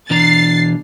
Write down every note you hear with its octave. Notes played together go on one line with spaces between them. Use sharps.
B2 E3 D4 A#5 A6 C7